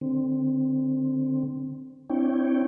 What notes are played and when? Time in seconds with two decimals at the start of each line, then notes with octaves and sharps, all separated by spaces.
0.01 D3 C4
2.09 C4 D4 E4 C#5 G5